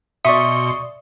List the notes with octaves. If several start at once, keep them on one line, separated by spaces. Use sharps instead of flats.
B2 D5 E5 C6 C#6 D#6 C#7